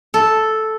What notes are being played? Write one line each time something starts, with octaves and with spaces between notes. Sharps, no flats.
A4